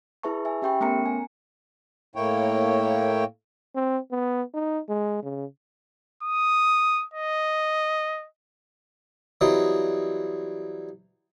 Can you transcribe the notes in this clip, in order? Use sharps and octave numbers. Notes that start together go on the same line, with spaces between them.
E4 G#4 B4 E5 A5 C#6
E5 G#5
C#4 G4 E5 G5 B5 C#6
A3 B3 C#4 A#4 A#5 C#7
G#5
A2 A#3 E4 C#5 G5
C4
B3
D#4
G#3
C#3
D#6
D#5
E3 F#3 G3 C4 D#5